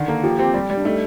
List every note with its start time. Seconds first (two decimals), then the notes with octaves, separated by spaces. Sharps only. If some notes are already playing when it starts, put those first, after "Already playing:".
Already playing: D3 D#3
0.08 A#3 A4
0.23 F3 G4
0.39 C4 G4
0.54 G3
0.70 G3
0.77 D4
0.85 A3 D#4